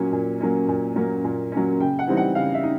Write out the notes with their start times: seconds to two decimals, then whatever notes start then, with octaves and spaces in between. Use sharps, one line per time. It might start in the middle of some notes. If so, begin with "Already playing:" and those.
Already playing: A#2 F#3 A#3 C#4 G#5
0.12 A#2
0.41 F#3 A#3 C#4
0.68 A#2
0.96 F#3 A#3 C#4
1.24 A#2
1.52 F#3 A#3 C#4
1.80 C#3 G5
1.99 F#5
2.07 E3 G3 C4 D#4
2.17 F#5
2.35 C#3 F5
2.54 E5
2.63 D#4